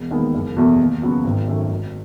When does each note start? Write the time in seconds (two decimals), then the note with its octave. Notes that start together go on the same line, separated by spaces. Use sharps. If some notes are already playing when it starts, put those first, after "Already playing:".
Already playing: E1
0.11 D#2 D#3 G#3 B3
0.34 F#1
0.57 E2 B2 A3
0.80 D#2
1.02 C#3 F#3 B3 F#4
1.24 G#1
1.47 F#2 D#3 A3 C#4
1.71 G#1